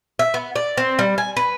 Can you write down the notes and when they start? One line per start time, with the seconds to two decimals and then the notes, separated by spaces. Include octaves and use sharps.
0.19 E5
0.34 B3
0.56 D5
0.77 C4
0.99 G3
1.18 G#5
1.37 B4